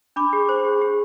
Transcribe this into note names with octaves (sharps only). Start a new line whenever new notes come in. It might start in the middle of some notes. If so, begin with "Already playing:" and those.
D4 B5 D6
G#4
C5
G#4
G#4